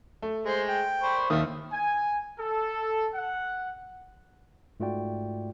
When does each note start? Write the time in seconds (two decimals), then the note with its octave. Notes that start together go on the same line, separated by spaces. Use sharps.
0.22 A3
0.46 G#3 C5
0.68 G5
1.03 C5 B5 C#6
1.30 D#2 D#3 E5 F5 D#6
1.72 G#5
2.38 A4
3.14 F#5
4.80 G#2 A3 F4 F#4 D5 G5